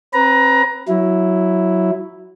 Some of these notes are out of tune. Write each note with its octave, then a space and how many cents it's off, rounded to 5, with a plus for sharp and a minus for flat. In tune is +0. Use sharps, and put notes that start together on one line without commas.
C4 +35 B4 +0 A#5 +20
F#3 +0 E4 +0